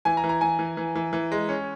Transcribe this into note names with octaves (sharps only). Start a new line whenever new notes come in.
E3 G#5
A#5
E3
A#5
E3 G#5
E3
E3
E3
E3
G#3
C#4